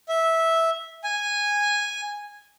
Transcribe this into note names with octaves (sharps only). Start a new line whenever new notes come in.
E5
G#5